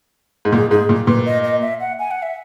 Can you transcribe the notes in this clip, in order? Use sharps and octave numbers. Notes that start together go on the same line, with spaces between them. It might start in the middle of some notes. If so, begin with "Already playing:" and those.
G#2
A#2 G#4
G#2 G#4
A#2
A#2 B4
D#5
D#5
E5
F#5
G#5
F#5
E5